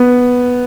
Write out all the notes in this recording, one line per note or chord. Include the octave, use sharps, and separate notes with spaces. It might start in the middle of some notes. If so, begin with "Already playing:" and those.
Already playing: B3